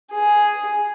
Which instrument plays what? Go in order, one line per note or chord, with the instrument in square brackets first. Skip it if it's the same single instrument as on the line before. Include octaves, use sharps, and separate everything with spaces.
[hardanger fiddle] G#4